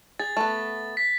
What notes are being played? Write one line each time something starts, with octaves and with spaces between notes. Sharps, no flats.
G#4 A6
A3 B3
B6